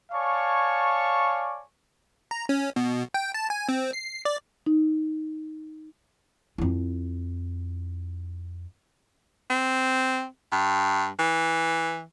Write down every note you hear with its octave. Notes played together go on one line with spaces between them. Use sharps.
C#5 D5 F5 G#5 A5 C#6
A#5
C#4
B2
G5
A5
G#5
C4
C7
D5
D#4
F2 E4
C4
G2
E3